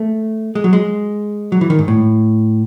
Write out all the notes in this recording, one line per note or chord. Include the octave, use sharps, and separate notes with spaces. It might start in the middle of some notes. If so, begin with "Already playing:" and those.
Already playing: A3
G#3
F#3
G#3
F#3
E3
D#3
G#2
A2